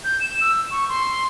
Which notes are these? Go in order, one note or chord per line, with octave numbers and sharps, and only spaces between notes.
G6
E7
E6
C#6
C6